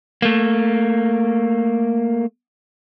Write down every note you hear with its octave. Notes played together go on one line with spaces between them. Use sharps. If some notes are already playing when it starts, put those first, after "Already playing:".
A3 A#3